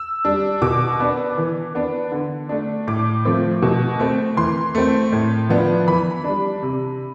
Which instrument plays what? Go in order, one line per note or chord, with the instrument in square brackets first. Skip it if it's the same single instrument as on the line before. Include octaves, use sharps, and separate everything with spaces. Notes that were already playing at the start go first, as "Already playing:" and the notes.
Already playing: [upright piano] E6
G3 D4
B2 D6
B3 D4
E3
B3 D4
D3
A3 D4
A2 D6
F3 A3 C4
B2
A3 C4
E3 C6
A3 C4
A2
F3 B3 D4
E3 B5
G3 D4
C3